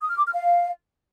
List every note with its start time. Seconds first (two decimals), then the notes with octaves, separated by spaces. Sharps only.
0.01 D#6
0.09 F6
0.17 D6
0.25 F6
0.33 F5